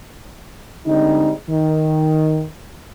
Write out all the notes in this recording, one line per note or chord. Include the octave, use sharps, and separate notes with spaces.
D3 G3 G#3 C4 D#4
D#3